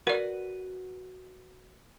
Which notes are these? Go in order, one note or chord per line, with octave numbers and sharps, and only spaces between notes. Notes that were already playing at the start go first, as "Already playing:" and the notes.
F#4 A#4 B4 D5 F#5